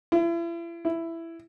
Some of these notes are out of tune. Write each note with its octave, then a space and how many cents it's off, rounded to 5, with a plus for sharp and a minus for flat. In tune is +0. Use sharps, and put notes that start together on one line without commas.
E4 +40
E4 +10